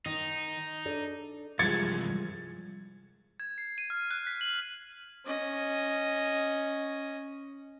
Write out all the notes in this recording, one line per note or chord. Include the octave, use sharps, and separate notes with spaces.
D#3 D#4
D4 A4 D5
C2 G2 E3 F3 G#3 G#6 A6 C#7
G#6
C7
D#7
F6
F#6
B6
F#7
C#4 D#5